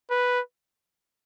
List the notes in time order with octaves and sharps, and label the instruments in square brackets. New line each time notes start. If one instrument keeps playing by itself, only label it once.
[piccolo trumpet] B4